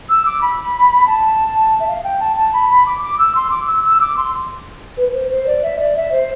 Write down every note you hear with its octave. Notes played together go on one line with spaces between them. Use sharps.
E6
D6
B5
A5
E5
F5
G5
A5
A5
B5
B5
D6
D6
E6
C6
D6
E6
E6
D6
C6
B4
B4
C5
C5
D5
E5
D5
E5
C5